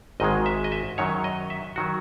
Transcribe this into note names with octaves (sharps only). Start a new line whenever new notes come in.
G#1 G#2 D#3 G#3 D#5
E5
D#5
E5
F#2 D#3 F#3 C#5
D#5
E5
D#3 F#3 F#4